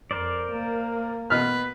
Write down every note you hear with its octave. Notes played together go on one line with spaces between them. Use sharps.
F2 A#4 C5 D5
A#3
B2 B4 F6